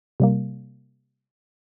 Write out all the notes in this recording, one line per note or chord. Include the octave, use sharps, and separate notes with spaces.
C3 G3 A#3